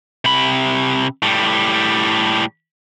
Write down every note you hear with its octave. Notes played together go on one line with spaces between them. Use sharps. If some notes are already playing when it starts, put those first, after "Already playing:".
C3 B5
A2 G3